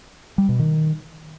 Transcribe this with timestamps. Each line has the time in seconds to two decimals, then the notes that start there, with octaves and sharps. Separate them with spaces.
0.38 G3
0.49 B2
0.59 D#3